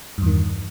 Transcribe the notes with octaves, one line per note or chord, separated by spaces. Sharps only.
E2 G2 D#3